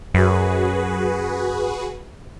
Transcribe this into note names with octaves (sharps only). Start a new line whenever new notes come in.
F#2 F#4 G#4 B4